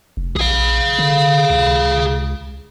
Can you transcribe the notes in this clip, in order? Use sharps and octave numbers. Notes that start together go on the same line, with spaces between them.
F1
A#1 G#4 F5
D3
C#2